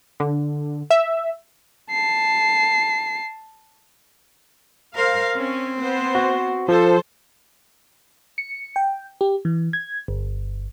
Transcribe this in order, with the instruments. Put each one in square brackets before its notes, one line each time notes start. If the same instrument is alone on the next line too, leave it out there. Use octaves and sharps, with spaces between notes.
[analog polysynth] D3
E5
[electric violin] A5 C7
[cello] A#4 C5 [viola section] F5
[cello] C4 [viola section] C#4
[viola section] B3 C5
[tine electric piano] F#4
[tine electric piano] F3 [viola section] A4 C5
[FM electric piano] C#7
G5
G4
E3
G#6
G1